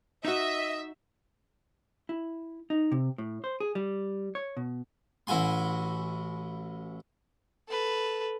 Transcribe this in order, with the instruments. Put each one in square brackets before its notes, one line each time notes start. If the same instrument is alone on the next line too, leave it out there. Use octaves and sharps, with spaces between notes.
[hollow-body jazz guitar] D#4 F#4 [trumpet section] D#5 [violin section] E5
[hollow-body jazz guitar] E4
D#4
C3
A2
C5
G#4
G3
C#5
B2
[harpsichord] A1 E4 F#4 G#5 C6
[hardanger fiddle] A4 B4